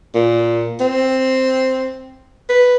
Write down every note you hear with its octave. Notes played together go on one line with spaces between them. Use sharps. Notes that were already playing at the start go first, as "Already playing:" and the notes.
A#2
C4
B4